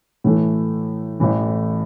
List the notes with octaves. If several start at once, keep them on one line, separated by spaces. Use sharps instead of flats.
A2 E3 A3 E4
A1 A2 E3